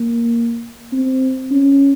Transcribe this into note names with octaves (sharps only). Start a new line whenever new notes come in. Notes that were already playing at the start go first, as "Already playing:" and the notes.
Already playing: A#3
C4
C#4